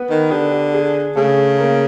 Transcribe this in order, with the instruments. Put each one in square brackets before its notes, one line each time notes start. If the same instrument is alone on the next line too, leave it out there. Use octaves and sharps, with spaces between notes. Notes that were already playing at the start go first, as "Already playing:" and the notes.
Already playing: [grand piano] B3 B4
[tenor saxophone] D#3
[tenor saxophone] D3 [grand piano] G4
[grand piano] G4
G#4
[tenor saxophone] C#3 [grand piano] A3 A4
[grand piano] A#3 A#4